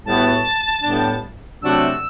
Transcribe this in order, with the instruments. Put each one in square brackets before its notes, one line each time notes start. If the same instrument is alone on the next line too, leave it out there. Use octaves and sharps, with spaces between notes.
[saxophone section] A2 G3 B3 F#4 [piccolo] A5
[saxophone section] A2 G3 B3 D4
[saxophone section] C3 F#3 A3 D4 F#4 [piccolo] E6